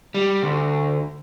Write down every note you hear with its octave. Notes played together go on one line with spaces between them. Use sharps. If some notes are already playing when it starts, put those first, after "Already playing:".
G3
D2